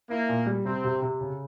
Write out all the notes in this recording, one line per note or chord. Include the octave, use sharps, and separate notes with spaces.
A#3 E4
A#2
G3
C3 C4
C3
C3
C#3